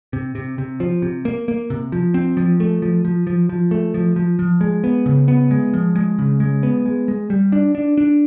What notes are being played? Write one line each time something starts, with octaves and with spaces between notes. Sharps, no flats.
C3
C3
C3
F3
C3
A#3
A#3
C3
F3
C4
F3
A3
F3
F3
F3
F3
A3
F3
F3
F3
G#3
B3
C#3
B3
G#3
F3
G#3
C#3
G#3
B3
G#3
G#3
G3
D4
D4
D4